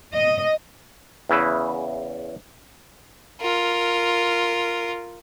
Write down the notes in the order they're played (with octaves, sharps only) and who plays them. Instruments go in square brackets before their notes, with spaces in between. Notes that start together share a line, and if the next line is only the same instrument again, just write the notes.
[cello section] D#5
[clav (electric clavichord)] E2 C#3 E4 B4
[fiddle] F4 A#4